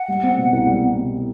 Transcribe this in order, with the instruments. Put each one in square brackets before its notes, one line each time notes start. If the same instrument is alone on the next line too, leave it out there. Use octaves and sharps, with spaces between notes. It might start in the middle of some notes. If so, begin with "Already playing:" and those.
Already playing: [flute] F#5
[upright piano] G3
C4
B2
C2
G3
C4
B2